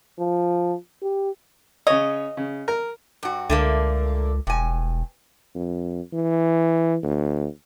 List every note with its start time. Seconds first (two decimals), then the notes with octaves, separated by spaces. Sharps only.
0.19 F3
1.03 G4
1.87 C#3 C#5 D#5
2.37 C#3
2.68 A#4
3.23 G2 F#4
3.50 C#2 D3 A3 A#3
4.47 E1 G2 G#5
5.55 F2
6.13 E3
7.03 D2